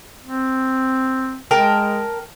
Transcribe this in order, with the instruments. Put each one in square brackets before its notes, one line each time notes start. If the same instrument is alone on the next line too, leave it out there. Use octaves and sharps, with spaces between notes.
[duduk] C4
[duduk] G#3 [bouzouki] A#4 G5 A5